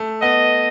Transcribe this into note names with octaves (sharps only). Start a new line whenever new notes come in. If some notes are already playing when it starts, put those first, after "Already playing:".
Already playing: A3
B3 D#5